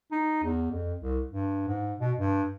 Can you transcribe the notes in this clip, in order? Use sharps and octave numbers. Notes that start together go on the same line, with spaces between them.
D#4
E2
F2
C2
G2
G#2
B2
G2